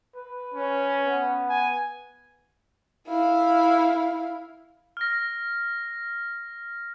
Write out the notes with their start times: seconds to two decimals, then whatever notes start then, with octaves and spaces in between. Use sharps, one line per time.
0.16 B4
0.54 C#4
1.05 B3
1.50 G#5
3.08 E4 F5
4.97 F6 A#6